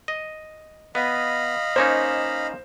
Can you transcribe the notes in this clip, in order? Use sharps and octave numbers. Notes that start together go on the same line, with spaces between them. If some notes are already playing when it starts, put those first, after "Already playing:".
D#5
B3 D#5 F5 B5
A#3 C#4 D#4 C5